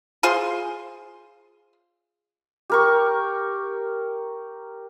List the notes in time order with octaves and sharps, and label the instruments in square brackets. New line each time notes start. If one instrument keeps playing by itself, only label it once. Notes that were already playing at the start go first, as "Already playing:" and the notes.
[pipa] F4 G#4 C5 C6
[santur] G4 A#4 C#6